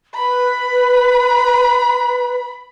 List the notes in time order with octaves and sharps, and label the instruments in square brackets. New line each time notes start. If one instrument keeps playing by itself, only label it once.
[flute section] B4 [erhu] B5